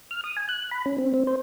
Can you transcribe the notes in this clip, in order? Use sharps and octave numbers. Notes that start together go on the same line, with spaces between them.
F6
D#6
G#5
F#6
B5
C#4
C4
C4
C5